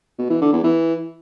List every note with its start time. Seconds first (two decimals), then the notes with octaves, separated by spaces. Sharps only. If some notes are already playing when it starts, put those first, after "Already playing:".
0.19 B2
0.30 E3
0.41 D3
0.53 E2
0.64 E3